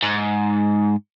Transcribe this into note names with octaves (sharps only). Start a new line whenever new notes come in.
G#2